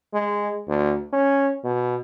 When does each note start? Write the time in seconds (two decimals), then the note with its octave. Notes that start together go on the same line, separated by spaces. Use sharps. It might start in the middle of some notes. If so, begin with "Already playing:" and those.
0.14 G#3
0.68 D2
1.13 C#4
1.64 B2